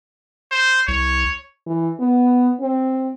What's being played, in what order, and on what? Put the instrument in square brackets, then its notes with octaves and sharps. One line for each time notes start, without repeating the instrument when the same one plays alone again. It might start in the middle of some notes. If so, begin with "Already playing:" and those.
[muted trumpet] C5
[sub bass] C2 [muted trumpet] C#5
[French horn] E3
B3
C4